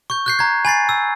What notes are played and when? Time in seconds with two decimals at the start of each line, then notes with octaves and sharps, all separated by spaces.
0.10 C#6 G6
0.26 F#6 G6 C7
0.39 A#5 G#6
0.65 G#5 B5 A6 C7
0.89 E6